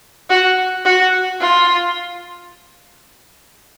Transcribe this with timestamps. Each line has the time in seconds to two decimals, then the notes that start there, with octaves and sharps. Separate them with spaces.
0.30 F#4
0.85 F#4
1.40 F4